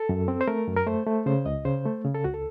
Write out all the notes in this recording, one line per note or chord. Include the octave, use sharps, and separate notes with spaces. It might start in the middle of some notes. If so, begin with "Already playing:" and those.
Already playing: A4
F#2
C4
C5
A3 A#4
F#2
A#4
A3 C5
A3
C#3 C5
C#2 D#5
C#3 C5
A3
C#3
A4
C#2 F#4
A4